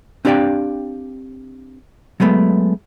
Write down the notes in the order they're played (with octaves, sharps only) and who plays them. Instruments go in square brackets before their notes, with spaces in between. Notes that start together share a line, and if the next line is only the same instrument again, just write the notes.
[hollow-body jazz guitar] C4 D4 G4 D5 F5 G5
F#3 G#3 A3 B3